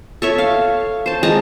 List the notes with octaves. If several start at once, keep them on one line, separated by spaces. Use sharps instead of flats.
A4 C#5 E5
F5
C5 A5
G#3 A5 A#5